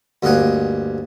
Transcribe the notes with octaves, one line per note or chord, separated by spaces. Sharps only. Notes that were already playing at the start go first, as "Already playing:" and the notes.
D2 G2 A#3 D#4 F#5 G#5